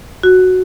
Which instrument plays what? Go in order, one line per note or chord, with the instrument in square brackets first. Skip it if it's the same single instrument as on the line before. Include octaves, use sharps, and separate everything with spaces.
[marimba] F#4